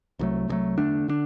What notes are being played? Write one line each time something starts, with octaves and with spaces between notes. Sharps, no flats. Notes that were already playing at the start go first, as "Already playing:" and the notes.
C2 C3 F#3 A3
C2 C3 F#3 A3
E2 D3 A3 D4
D3 A3 D4